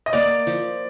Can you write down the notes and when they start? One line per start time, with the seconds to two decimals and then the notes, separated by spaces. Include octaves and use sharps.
0.06 D#5
0.13 A#3 D5
0.47 F3